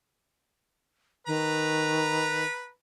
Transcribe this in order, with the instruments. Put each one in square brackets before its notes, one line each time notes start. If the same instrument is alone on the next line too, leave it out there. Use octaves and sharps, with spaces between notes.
[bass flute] D#3 [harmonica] B4 A#5